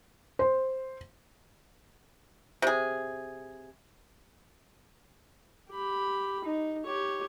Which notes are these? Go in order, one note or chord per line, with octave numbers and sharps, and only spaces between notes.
C5
C3 G#4
G4 B5
D#4
G4 C#5